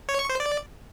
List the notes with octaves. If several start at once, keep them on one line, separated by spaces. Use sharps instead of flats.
C#5
C#6
C5
D5